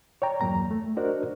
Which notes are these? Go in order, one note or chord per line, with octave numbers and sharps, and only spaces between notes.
C#5 D5 G5 A#5
E2 G2 F#3 A#3 A#5
A3
D4 F#4 A#4 C5 D5 D#5